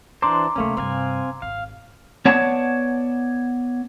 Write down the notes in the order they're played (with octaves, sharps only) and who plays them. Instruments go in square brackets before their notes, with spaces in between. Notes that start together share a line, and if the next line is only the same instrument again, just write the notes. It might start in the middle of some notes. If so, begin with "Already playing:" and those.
[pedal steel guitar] E3 D4 C5 [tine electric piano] A#5 C6 D6
[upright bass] D2 C3 [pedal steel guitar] A3 A#3 C#4
[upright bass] G2 C3 [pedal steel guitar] C4 F5 G#5
[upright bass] G#1 [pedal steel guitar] F5
[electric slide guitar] B3 C#5 D5 F#5 A5